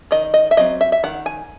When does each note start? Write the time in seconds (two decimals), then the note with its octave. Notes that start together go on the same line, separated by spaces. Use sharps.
0.11 D#3 D#5
0.34 D#5
0.51 E5
0.57 F#3 C4 D#5
0.81 E5
0.92 E5
1.03 D#3 F#5
1.26 G#5